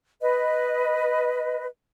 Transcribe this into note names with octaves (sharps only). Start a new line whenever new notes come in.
B4 D#5